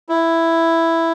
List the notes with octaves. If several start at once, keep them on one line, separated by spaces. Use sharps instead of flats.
E4